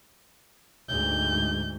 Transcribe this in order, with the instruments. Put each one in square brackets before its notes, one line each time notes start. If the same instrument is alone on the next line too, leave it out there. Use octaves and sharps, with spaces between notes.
[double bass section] D2 G#2 [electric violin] G6